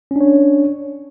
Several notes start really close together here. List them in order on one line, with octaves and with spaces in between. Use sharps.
C#4 D4 C#5